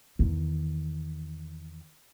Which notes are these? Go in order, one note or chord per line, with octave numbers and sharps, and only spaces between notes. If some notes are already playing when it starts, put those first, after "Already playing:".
E2 D#3